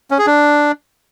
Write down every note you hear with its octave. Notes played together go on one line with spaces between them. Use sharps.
C#4
G#4
D4